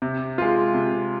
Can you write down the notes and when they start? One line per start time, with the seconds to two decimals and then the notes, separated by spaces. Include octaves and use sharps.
0.02 C3
0.38 G#3 F4
0.74 C3